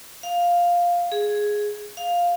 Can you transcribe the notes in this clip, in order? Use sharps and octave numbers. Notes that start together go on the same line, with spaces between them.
F5
G#4
F5